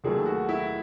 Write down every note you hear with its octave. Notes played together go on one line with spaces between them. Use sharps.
D#2 D#3 F#3 A3 G#4
F#4
E4